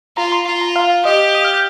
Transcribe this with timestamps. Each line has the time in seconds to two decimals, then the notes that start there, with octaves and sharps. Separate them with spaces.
0.17 F4 A#5
0.32 C6
0.46 F4 C6
0.61 A#5
0.76 F5
1.05 G4 D#5
1.34 D#6
1.44 F6
1.54 G6